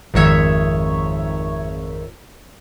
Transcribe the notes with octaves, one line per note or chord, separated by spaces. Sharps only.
G#1 F2 D#3 F3 C#5 E5